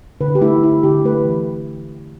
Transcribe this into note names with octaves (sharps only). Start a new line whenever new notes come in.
D3 B4
G4
A3 E4
D3 E4
D3 G4
A3 B4
E3